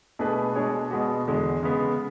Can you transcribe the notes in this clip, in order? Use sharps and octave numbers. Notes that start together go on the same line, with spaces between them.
B2 A3 D4 G#4 B4
B2 G#3 D4 G#4 C#5
B2 G#3 B3 F#4
E2 D3 G#3
C#3 G#3 B3